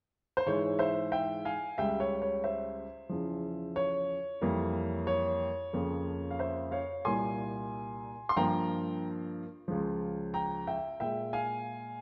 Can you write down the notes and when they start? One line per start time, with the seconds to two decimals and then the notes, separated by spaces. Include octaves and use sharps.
0.37 C5
0.46 G#2 E3 G#3 C#5
0.79 C5 E5
1.12 E5 G5
1.45 F5 G#5
1.78 C#2 C#3 G3 E5 G5
2.00 C#5
2.22 C#5
2.44 C5 E5
3.09 E2 C#3 F3
3.76 C#5
4.41 F2 E3 G3 A#3
5.07 C#5
5.73 F2 C#3 F3 A#3
6.31 F5
6.39 C5 E5
6.72 C#5 F5
7.05 C2 A#2 G3 A#3 G#5 C6
8.29 C6
8.36 G2 F3 A#3 G5 A#5
9.68 C#2 C#3 F3
10.34 G5 A#5
10.67 E5 G5
11.00 A#2 G#3 E5 G5
11.33 F5 G#5